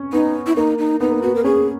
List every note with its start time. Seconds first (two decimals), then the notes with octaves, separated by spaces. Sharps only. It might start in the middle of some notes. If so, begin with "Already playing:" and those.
Already playing: C#4
0.13 B3 D#4
0.47 E4
0.56 A#3 D#4
0.78 D#4
1.00 B3 D#4
1.12 A#3
1.22 B3 F#4
1.35 A#4
1.44 C#4 G#4